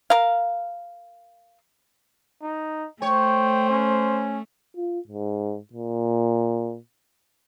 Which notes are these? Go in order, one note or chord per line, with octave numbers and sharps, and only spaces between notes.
A#4 F5
D#4
A3 C5 C#5 G5
C#4
F4
G#2
A#2